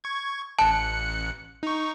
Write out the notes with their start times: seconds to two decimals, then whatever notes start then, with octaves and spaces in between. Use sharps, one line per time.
0.04 C#6 G#6
0.59 A1 A5 F#6 C#7
1.63 D#4 C#6